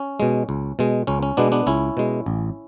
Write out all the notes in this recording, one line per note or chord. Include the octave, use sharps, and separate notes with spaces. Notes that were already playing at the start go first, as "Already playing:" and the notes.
Already playing: C#4
B2 G#3
C#2
B2 G#3
C#2 C#4
C#4
B2 G#3 B3 D4
B3 D4
C#2 C#4 E4
B2 G#3
A1